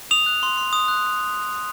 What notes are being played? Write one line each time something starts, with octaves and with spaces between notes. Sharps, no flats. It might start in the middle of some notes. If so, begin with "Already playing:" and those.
D#6 F7
F#6
C6
C6
D#6
F#6